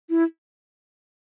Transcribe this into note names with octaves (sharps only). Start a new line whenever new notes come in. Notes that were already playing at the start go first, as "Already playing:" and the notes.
E4